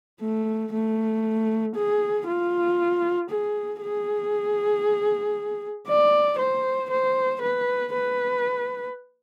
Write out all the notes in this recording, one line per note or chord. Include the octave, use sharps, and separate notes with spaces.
A3
A3
G#4
F4
G#4
G#4
D5
C5
C5
B4
B4